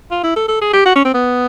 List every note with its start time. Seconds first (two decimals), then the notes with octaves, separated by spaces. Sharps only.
0.11 F4
0.24 E4
0.36 A4
0.48 A4
0.62 G#4
0.73 G4
0.86 F#4
0.96 C#4
1.05 C4
1.14 B3